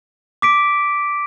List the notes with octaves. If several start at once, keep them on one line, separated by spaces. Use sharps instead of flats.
D6 B6 D7